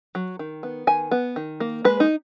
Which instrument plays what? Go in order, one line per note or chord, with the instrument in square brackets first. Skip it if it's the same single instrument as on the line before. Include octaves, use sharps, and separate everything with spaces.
[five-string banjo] F#3
D#3
B3
D#3 G#5
B3
D#3
A#3
G#3 B4
D#4